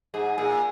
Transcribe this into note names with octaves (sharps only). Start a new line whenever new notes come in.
G#2 G#4
A#2 G#4